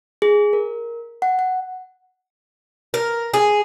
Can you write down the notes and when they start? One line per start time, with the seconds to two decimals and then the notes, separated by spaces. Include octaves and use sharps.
0.22 G#4
0.53 A#4
1.22 F#5
1.39 F#5
2.94 A#4
3.34 G#4